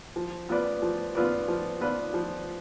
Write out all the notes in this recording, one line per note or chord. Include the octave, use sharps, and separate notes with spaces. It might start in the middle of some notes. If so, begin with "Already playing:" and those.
F3
B3 F4 B4 D5
F3
B3 F4 B4 D5
F3
B3 F4 B4 D5
F3